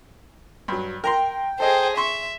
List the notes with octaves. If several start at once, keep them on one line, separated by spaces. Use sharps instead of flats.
G2 F#3
A#4 G5 A#5 C6
G#4 A4 C5 D#5
E5 C6 C#6